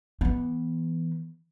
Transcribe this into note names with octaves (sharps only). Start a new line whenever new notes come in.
E3 B3